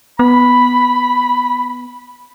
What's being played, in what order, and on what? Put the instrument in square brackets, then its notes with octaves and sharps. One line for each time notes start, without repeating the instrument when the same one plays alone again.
[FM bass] B3 [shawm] B5